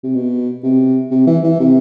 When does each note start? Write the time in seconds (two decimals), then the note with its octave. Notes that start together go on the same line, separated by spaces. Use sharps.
0.04 C3
0.15 B2
0.63 C3
1.11 C3
1.27 E3
1.44 E3
1.60 C3